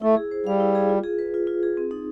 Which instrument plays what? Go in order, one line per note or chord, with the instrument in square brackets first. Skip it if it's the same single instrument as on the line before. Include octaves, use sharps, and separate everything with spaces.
[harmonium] A3 [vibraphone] E4
[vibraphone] G#4
C5
[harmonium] G3 [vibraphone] F5
[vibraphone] E4
G#4
F4
G#4
B4
F4
F4
G#4
C4
D#4